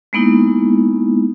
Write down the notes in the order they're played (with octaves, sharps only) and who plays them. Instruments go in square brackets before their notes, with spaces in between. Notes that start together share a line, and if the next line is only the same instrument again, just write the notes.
[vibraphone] G#3 A#3 B3 D#4 E4